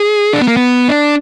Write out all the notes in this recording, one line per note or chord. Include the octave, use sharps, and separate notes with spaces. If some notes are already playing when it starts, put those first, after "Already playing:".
Already playing: G#4
D4
B3
A#3
B3
D4